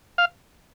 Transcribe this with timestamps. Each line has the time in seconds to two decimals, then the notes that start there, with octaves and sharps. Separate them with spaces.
0.18 F5